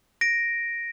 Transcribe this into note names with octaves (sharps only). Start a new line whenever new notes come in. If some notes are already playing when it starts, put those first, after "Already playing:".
A#6 D7